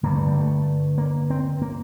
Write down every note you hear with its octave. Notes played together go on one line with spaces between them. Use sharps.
G2 D3 A#3
A3
G3
A3
A#3
C4
A#3